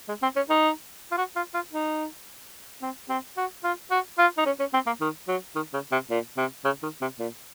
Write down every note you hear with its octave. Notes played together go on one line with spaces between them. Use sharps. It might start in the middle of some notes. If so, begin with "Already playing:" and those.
G#3
C4
C#4
D#4
F4
F#4
F4
F4
D#4
C4
C4
F#4
F4
F#4
F4
D#4
C#4
C#4
C4
A#3
D#3
F#3
D#3
C#3
C3
A#2
C3
C#3
D#3
C3
A#2